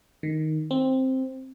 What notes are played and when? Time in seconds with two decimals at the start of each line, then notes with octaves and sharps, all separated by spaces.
0.23 D#3
0.71 C4